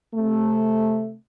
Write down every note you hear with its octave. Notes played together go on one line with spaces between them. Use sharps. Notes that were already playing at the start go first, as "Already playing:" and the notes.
C3 A3